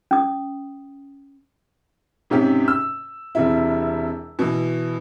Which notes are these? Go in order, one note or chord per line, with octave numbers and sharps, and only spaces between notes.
C#4 D#6
G#2 C3 C#4 G4
E6
E1 C3 E4
B2 E3